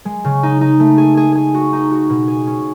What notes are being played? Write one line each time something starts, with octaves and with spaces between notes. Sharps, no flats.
G#3
C#3
D#4
D#4
A3
G#4
G#4
G#4
F#4
D#4
F#4
B2
G#4
C#4